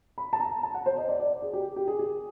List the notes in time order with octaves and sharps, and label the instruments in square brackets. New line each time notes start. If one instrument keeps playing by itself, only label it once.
[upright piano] B5
A5
A#5
A5
F#5
C5
D#5
D5
D5
G#4
G4
G4
G#4
G#4